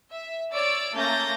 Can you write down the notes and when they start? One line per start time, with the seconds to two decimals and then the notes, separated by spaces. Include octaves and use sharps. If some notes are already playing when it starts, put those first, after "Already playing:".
0.11 E5
0.53 C#5 D5 E6 A6 D7
0.94 A3 A#3 C#4 G6 A6 A#6